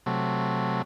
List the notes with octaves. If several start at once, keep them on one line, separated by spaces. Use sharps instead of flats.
C3 F#3 A3